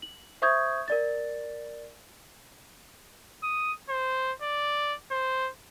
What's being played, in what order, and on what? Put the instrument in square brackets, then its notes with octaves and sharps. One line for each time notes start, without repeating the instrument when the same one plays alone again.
[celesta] F#7
C5 E5 C#6 D#6 G6 G#6
A#4 D5 A6
[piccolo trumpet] D#6
C5
D5
C5